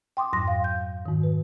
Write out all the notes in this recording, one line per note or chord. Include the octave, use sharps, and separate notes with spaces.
G5 C6 D6 D#6
F2 G#2 F#3 C6 A#6
F5
G6
G#2 D#3
B4